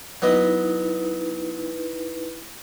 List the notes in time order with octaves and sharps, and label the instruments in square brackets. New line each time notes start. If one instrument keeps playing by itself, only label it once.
[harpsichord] F#3 B3 D#5 [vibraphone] D#4 E4 B4